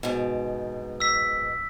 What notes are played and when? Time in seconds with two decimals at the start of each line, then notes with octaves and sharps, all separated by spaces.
0.03 G#2 B2
1.00 E6 B6